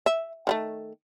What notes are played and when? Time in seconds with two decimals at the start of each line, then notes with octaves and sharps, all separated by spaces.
0.06 E5
0.47 D#3 G3 A3